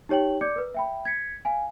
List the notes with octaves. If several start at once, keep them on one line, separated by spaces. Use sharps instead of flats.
D#4 G4 C#5 G5 F#7
D5 D6 G6 C#7
A#4 B4
E5 G5 B5
G#6 B6 C#7
F5 G#5